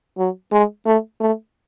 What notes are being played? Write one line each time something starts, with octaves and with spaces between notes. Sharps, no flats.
F#3
G#3
A3
A3